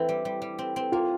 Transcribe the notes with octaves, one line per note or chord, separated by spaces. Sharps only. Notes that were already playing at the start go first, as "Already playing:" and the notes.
Already playing: E3 C4 E4
G3
G3
G3
C4
C4
A#3 F4